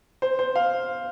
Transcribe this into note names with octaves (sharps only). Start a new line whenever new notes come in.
C5
C5
F5